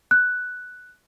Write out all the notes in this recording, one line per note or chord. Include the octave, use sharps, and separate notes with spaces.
F#6